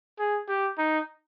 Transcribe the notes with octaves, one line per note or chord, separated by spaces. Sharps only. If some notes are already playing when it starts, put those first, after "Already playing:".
G#4
G4
D#4